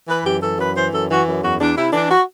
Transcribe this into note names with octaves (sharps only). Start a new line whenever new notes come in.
E3 B4
F#2 G4
E3 A4
F#2 B4
E3 C5
F#2 A4
E3 F#4
F#2
E2 F#4
E2 D4
C3 E4
E3 D4
F#4